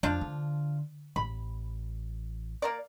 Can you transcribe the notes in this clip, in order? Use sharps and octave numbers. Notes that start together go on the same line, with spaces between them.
F2 F3 D4 F4
D3
A1 B5
A#3 A#4 D5